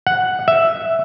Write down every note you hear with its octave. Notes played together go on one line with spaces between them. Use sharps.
F#5
E5